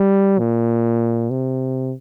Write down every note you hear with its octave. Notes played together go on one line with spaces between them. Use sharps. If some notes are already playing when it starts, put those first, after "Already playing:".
Already playing: G3
A#2
C3